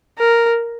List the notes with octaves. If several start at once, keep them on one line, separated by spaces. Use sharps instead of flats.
A#4